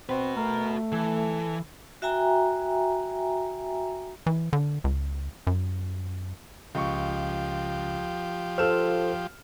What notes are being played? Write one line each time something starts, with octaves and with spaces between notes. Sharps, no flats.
C4 F#4 B4
A3 A#4
E3 A4
F#4 E5 G5 G#5 A#5
E3
D3
C#2
F#2
C#2 F3 G4 C#6
F4 A4 C5 F6 E7